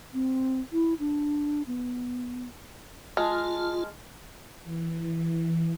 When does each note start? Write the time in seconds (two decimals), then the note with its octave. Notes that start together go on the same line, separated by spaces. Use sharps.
0.14 C4
0.72 E4
0.99 D4
1.67 B3
3.17 G#3 F4 A5 F6
4.63 E3